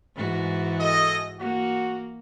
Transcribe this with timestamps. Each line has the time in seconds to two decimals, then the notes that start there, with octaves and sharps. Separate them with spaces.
0.16 G#2 E3 F#4
0.80 G#4 A4 D#5
1.39 A#3 F#4